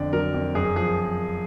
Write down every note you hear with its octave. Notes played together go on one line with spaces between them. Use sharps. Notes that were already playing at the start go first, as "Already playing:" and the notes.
Already playing: F2 D3 D5
F#3 A#4
F2
F#2 G#4
F3 G#4